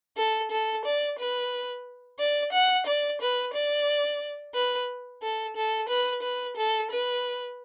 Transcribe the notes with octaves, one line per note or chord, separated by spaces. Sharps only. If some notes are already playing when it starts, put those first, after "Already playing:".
A4
A4
D5
B4
D5
F#5
D5
B4
D5
B4
A4
A4
B4
B4
A4
B4